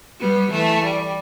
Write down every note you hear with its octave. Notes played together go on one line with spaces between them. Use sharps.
G3 B3
E3 A3
G3